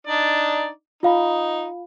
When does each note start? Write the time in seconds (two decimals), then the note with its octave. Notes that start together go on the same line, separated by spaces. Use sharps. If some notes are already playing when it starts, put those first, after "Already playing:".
0.07 D4 D#4 D5
1.03 D#4 F4 F5 B5